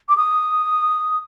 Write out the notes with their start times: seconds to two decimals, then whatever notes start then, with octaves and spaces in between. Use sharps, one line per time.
0.08 D6
0.17 D#6